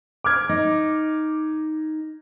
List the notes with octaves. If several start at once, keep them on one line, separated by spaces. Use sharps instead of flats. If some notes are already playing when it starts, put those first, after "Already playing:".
D6 F6 G#6
D#4